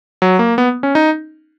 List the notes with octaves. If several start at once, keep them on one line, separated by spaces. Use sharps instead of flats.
F#3
A#3
B3
C#4
D#4